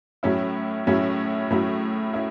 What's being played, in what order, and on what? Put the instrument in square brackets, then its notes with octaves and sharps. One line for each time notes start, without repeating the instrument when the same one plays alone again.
[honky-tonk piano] A2 F#3 C#4 E4
A2 F#3 C#4 E4
A2 F#3 C#4 E4
C#4 E4